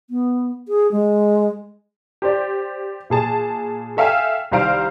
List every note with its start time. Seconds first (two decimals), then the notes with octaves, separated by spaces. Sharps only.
0.10 B3
0.68 G#4
0.92 G#3
2.22 G4 C5 D5
3.10 A#2 G#4 A5
3.97 A4 E5 F5 G5 G#5
4.51 C2 D#3 C5 F5 A#5 D7